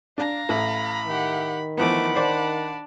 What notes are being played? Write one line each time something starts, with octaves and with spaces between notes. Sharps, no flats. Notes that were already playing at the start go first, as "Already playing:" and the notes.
D4 F5 A#5
A1 B5
D#3 G4 F#5
E3 F3 A3 B3 F#5 B5 D6
D4 C5 D5